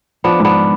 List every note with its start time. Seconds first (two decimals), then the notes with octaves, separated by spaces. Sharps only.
0.24 F3 B3 D4
0.40 G#2 B3 D4